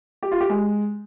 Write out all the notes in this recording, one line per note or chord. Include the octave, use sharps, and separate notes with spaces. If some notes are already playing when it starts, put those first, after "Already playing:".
G4
F4
G4
G#3